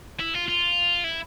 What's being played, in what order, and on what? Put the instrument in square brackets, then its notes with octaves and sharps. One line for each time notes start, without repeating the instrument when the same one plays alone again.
[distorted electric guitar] E4
F4
F4
E4